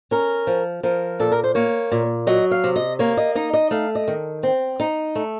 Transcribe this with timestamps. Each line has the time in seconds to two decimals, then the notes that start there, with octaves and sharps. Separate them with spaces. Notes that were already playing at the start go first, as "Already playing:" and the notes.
0.11 C#4 A#4
0.47 F3
0.83 F3 A#4
1.20 A#2 A4
1.32 A#4
1.44 C5
1.55 A#3 C#5
1.92 A#2
2.27 F#3 D#5
2.51 F5
2.64 C3
2.76 D#5
2.99 A#3 C#5
3.17 D#5
3.35 D#4 D#5
3.53 D#5
3.71 A3 F5
3.95 D#5
4.08 D#3
4.43 C4
4.80 D#4
5.15 A3